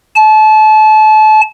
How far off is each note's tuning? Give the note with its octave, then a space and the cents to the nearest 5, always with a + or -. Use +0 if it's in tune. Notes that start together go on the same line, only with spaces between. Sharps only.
A5 -30